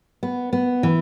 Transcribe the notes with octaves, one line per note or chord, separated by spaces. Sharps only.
B3
B3
E3